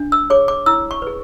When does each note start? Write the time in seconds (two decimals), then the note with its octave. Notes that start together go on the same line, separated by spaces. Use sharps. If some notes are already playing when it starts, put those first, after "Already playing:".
Already playing: D4
0.12 E6
0.30 G#4 C#5 D6
0.48 D6
0.66 E4 E6
0.91 C#6
1.02 G#4 B4